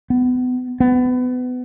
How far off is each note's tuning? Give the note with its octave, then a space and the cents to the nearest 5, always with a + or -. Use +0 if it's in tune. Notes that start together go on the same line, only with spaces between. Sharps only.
B3 +30
B3 +25